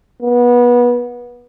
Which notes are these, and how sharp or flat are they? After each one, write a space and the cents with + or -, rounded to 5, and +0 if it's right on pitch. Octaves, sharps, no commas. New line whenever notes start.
B3 -25